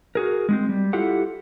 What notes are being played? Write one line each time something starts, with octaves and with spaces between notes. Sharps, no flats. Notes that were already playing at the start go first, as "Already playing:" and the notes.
F#4 G#4 A#4
G#3 B3 C4
G3
E4 F4 G4 A4 F#5